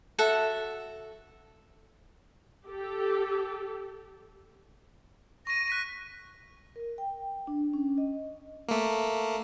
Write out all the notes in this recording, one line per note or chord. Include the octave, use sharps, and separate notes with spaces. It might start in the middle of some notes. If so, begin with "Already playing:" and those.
F#4 A4 E5 F#5
G4 A4
C#6 A#6 D#7
F#6 B6 D#7
A#4
G5
D4
C#4
D#5
A3 A#3